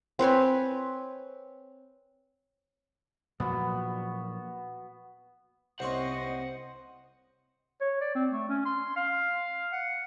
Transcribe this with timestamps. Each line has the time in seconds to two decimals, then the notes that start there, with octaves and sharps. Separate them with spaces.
0.19 C4 B4 C#5 G#5
3.40 A#2 F3 F#3 B3 F#4
5.80 C2 C4 C#4 C5 D#5 F#5 C6 C#6
7.81 C#5
8.01 D5
8.15 C4
8.31 A3
8.49 C#4
8.65 C6
8.96 F5
9.72 F#5